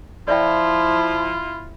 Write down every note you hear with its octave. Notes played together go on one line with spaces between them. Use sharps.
F3 E4 F4 D5 E5 G5